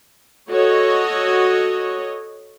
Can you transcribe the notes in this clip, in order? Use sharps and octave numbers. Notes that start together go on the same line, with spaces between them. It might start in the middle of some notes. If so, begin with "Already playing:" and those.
F#4 A4 C#5 D#5